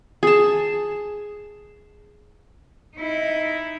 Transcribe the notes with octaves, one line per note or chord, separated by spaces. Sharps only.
G#4 A5
D#4 E4